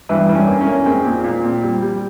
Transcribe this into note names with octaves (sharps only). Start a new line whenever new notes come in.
G2 E3 E4
G2
C#4
A#3
C#4
A#3
G#3 C4
A#2
A#2
C4
G3
G3